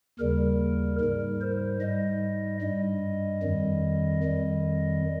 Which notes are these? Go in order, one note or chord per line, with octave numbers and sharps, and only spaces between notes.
D#2 C#3 G3 A#4
G#2 G3 A#4
C5
G#2 G3 D#5
G2 G3 D#5
F2 D#3 G3
F2 D#3 G3